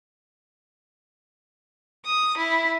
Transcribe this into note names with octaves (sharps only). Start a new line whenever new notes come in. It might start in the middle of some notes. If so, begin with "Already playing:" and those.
D#6
E4